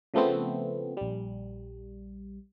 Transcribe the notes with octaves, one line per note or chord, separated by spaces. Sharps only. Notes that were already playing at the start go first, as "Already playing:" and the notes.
C#3 F3 A3 B3 C4
A#1 G3